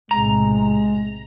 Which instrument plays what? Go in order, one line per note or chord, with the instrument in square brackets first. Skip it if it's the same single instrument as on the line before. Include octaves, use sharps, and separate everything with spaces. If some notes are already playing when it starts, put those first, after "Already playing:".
[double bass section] B1 A2 C3 [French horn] G#3 [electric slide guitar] A#5